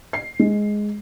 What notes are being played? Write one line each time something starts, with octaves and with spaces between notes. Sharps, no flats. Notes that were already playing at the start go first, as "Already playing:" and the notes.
C7
G#3